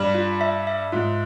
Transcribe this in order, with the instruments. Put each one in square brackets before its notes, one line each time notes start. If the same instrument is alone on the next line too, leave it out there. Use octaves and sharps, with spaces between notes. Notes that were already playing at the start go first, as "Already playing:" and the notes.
Already playing: [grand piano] G2 G3
[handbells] F4
E5
E5
[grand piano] G#2 [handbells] F4